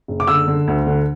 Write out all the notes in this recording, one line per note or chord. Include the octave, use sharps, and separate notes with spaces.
F#1
D6
D3 E6
D3
D2
D3